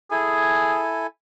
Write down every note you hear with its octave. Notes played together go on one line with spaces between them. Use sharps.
E4 G#4 A4 G#5